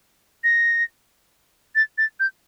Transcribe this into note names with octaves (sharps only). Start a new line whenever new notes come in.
A#6
A6
A6
G6